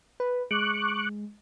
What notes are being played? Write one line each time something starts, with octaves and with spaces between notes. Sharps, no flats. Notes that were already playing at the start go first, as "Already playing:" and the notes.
B4
G#3 C#6 D6 F#6